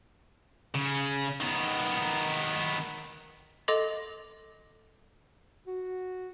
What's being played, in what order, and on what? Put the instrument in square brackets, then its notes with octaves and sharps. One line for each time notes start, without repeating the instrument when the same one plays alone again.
[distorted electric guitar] C#3 C#4
D#3 B3
[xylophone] A4 D#5 C6 D6 A#6 F7
[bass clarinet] F#4